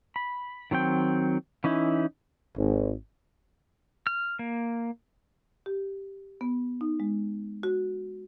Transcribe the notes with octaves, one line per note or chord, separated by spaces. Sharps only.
B5
D#3 F#3 C4 G5
E3 C#4 D#4 E4
G#1
F6
A#3
G4
B3
D#4
G#3
F#4